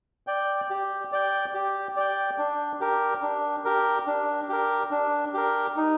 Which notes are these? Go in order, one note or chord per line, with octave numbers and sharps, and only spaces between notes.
D5 G5
G4
D5 G5
G4
D5 G5
D4
G4 A#4
D4
G4 A#4
D4
G4 A#4
D4
G4 A#4
D#4